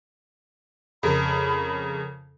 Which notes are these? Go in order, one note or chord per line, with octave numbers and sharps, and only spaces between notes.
F2 C#3 A#4 B5